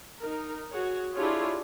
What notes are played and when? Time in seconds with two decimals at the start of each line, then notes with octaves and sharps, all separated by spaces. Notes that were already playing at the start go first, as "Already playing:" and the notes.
0.20 D#4 A#4
0.71 F#4 G#4 C#5
1.15 D4 E4 F4 G4 G#4 C#5